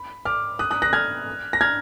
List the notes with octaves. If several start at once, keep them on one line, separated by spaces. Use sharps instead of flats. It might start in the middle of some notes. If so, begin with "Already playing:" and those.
Already playing: B5
D6 F6
D#6 F#6
D#6 F#6
F#6 A#6
F6 G#6
A#6
F6 G#6